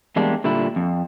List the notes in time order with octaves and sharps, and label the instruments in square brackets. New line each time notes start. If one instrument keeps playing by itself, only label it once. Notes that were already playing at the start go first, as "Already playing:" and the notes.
[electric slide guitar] E2 G3 G#3 A#3 D4
A#2 D3 G3 E4
F2